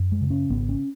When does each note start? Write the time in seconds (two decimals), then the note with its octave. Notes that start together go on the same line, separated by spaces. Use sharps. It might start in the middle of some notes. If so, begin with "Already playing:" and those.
Already playing: F#2
0.12 G#3
0.21 C#3
0.30 C#4
0.50 G#1 B3
0.69 C#4